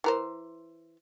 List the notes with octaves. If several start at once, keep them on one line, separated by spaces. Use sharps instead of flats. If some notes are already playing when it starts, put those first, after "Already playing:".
E3 A#4 C5